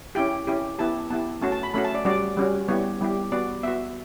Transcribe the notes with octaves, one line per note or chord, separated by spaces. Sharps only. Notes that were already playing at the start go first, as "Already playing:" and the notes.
C#4 E4 G4 G5
C#4 E4 G4
B3 E4 G4 A5
B3 E4 G4 A5
A3 C#4 F#4 A5
A5
B5
A3 C#4 F#4 B5
A5
D5
G3 C#4 F#4 D5
G3 C#4 F#4
G3 B3 E4 G4 C#5
G3 B3 E4 G4
B3 F#4 D5
B3 F#4 E5